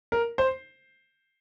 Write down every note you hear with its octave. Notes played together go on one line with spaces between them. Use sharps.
A#4
C5